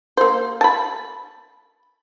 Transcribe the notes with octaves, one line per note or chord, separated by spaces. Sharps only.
A#3 C5
A5 B5